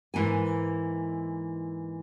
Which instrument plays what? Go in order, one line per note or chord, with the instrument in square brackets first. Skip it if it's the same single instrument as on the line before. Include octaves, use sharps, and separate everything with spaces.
[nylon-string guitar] G#2 E3 A#3 G#5